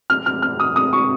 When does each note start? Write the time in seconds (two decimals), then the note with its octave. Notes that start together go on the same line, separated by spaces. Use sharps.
0.10 F6
0.26 F6
0.42 F6
0.60 D#6
0.76 D#6
0.93 C#6